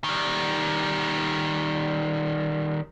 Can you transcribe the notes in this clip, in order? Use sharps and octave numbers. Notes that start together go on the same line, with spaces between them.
D#3 G3